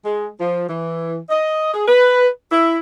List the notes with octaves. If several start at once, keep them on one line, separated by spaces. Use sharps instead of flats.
G#3
F3
E3
D#5
G#4
B4
E4